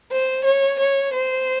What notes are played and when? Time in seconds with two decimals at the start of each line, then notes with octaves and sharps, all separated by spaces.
0.12 C5
0.45 C#5
0.80 C#5
1.14 C5